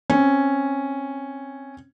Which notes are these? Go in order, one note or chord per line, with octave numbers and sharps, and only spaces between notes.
C4 C#4